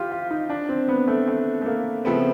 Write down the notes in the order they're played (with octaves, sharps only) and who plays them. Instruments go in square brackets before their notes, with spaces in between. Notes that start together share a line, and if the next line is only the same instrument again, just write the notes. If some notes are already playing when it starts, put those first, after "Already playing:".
Already playing: [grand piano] F3 E4 [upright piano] F4 G4
[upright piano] F4
D#4
D4
C4
B3
A3
A3
A3
A#3
[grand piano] C#3 F3 A3 C4 [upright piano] B3